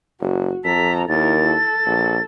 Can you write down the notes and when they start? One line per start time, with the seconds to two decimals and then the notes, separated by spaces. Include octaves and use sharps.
0.21 F#1 F#4
0.65 F2 A4 A#5 B6
1.09 D#2 E4 A#4 A6
1.48 A4
1.86 A#1